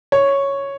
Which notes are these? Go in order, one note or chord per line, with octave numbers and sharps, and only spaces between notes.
C#5